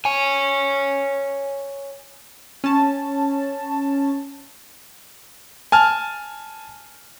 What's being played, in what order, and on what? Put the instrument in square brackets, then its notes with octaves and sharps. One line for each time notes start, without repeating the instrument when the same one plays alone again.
[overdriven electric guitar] C#5 G#5
[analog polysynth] C#4 A5
[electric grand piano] G#5 A5 F6